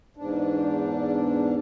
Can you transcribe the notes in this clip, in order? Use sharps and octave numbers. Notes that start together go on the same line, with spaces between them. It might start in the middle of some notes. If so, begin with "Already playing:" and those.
E2 G#2 D4